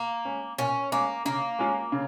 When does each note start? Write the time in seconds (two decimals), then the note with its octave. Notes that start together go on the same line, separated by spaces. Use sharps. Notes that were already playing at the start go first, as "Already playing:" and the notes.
Already playing: A#3
0.25 G#3 C#4
0.58 A#2 C#4
0.92 G#3 A#3 C#4
1.25 C#3 A#3
1.59 G#3 C#4 F4
1.92 C#3